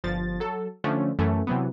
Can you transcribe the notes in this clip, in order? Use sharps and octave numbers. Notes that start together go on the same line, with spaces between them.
G1 F3 A6
F#3 A4
D3 F3 A3 C#4
F#2 E3 A3 C#4
C3 E3 F#3 B3